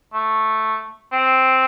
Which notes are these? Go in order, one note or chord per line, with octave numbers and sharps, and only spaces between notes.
A3
C4